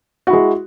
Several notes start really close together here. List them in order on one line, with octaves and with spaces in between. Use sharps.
F#4 E4 G#3